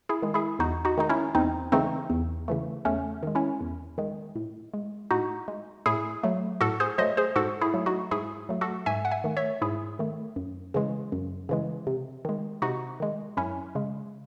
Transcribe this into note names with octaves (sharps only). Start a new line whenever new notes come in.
E4 G#4
D#3 G#3
E4 G#4
E2 D#4 F#4
D#4 F#4
D#3 G#3 D#4
C#4 E4
E2 C4 D#4
C#3 E3 A3 C4 D#4
E2
C#3 E3 A3
E2 A3 C#4
D#3 G#3
C#4 E4
E2
D#3 G#3
A2
G#3
A2 D#4 F#4
G#3
A2 E4 G#4
F#3 A3
A2 F#4 A4
G#4 C5
F#3 A3 C5 D#5
G#4 C5
G#2 F#4 A4
E4 G#4
F#3 A3
D#4 F#4
G#2 E4 G#4
F#3 A3
F#4 A4
G#2 E5 G#5
F#5
E5 G#5
D#3 A3
C#5 E5
G#2 E4 G#4
D#3 A3
F#2
C#3 E3 G#3
F#2
C#3 E3 G#3
C3
D#3 G#3
C3 D#4 F#4
D#3 G#3
F#2 C#4 E4
C#3 G#3